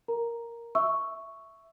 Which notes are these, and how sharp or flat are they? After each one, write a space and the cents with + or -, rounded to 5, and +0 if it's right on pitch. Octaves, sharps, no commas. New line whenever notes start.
A#4 +0 A#5 +0
E5 +0 C#6 +0 E6 +0